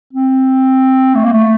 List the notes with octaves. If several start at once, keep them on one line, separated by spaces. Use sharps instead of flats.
C4
A3
A#3
A3